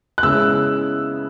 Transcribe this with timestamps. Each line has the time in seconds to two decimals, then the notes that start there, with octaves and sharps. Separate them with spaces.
0.18 F#6
0.23 C#3 G#3 B3 E4 E6